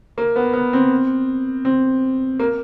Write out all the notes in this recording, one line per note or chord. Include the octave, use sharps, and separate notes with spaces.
A#3
B3
B3
C4
C4
A#3